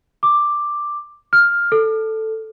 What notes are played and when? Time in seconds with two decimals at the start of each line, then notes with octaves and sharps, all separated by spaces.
0.23 D6
1.33 F6
1.72 A4